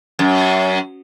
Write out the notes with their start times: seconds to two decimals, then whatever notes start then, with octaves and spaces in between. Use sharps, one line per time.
0.19 F#2